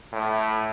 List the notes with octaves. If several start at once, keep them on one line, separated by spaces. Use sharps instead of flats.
A2